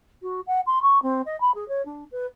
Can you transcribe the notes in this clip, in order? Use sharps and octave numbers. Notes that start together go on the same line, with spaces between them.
F#4
F#5
C6
C#6
C4
D#5
B5
G#4
C#5
D4
B4